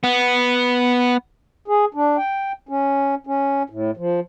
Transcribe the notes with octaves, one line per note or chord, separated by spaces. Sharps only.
B3
G#4
D4
G5
C#4
C#4
A2
F3